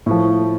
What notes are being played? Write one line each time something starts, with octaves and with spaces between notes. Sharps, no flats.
A2 F3